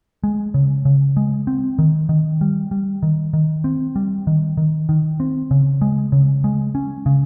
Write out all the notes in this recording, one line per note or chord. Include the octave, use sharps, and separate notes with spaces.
G#3
C#3
C#3
G#3
C4
D#3
D#3
G3
G3
D#3
D#3
C4
G3
D#3
D#3
D#3
C4
C#3
G#3
C#3
G#3
C#4
C#3